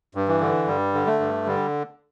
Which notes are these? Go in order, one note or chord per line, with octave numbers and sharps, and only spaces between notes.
G2
E3
D3
G2 G3
D3
A3
G2
D3 G3